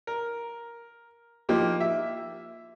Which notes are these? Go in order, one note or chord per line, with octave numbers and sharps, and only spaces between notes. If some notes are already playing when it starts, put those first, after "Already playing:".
A#4
F3 A#3 D#4 G4
E5